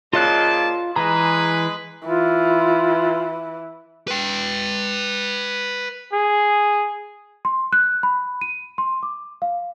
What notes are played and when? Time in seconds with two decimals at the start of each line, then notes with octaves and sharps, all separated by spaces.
0.13 A#2 C#3 F4 D#5 A5 F#6
0.96 E3 G#3 G#4 B4 A#5
2.06 E3 F4
4.08 B4 G5
6.13 G#4
7.45 C6
7.73 F#6
8.03 B5
8.41 D#7
8.78 C6
9.03 D6
9.42 F5